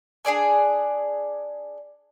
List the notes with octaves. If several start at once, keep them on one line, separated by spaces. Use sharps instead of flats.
D4 G#4 D5 G#5